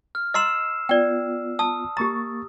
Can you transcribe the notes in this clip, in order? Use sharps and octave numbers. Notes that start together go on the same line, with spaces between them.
F6
D#5 A#5 C6 E6 C7 E7
B3 F4 D5 G5
A5 D#6
A#3 G4 A#5 C#6 A6